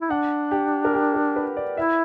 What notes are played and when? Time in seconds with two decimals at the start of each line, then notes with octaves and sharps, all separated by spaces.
0.01 E4
0.10 D4 F#5
0.51 G4
0.85 A#4
0.94 G4
1.14 A#4
1.36 B4
1.57 D5
1.77 E4 E5